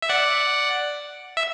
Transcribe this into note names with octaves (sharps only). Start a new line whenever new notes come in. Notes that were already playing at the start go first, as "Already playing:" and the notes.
E5
D5 F#5
E5